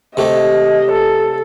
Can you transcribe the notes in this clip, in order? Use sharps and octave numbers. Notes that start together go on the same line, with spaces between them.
C3 A3 G4 D#5
A4